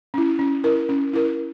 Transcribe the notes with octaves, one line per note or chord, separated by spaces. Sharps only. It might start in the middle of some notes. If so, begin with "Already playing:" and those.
C#4 E4
C#4
E4 A#4
C#4
E4 A#4